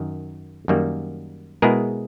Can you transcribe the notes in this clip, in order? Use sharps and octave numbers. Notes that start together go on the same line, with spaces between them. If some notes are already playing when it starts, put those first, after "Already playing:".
Already playing: F#2 D#3
F#2 D#3 G3 A#3
B2 G#3 B3 E4 G#4 A#4